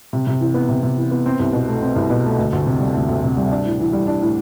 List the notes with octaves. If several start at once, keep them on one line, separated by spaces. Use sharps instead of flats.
C3
C3
E3
B3
C3
C3
E3
B3
C4
C2
B2
A3
C4
C2
B2
A3
D2
D2
C3
G3
D2
D2
C3
G3
D4
A2
E3
G3
D4
A2